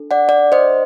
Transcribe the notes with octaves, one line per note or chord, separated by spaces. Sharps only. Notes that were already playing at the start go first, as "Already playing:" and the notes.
Already playing: D4 A4
D5 F#5
D5
C5 D#5